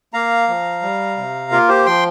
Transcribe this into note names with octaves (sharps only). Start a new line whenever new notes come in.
A#3 F5 A#5
F3
G3
C3
A#3 F4 A#4
G4 C5
F3 G5 C6